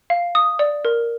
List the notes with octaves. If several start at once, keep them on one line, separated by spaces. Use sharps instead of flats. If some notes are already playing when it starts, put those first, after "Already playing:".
F5
D#6
D5
A#4